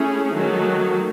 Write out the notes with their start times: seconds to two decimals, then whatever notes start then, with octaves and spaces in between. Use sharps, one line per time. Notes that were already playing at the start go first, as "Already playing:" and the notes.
Already playing: A3 C#4 E4 G#4
0.33 D#3 F#3 A3